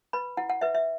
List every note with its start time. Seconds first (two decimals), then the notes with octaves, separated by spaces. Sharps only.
0.13 B4 B5
0.37 E4 F#5
0.49 F#5
0.61 B4 E5
0.75 E5